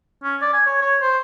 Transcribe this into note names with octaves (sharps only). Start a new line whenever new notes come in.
C#4
D5
G#5
C#5
C#5
C5